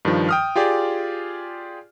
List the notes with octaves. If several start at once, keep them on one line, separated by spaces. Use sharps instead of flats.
G2 D#3 F3
G5 D#6 F6
F4 G4 G#4 D5